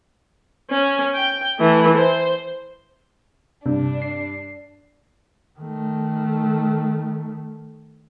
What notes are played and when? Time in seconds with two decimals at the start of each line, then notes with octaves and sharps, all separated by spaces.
0.70 C#4
1.15 G5
1.58 E3 A3
1.96 C5
3.66 G2 C3 D4
4.02 C7
5.59 D#3 A3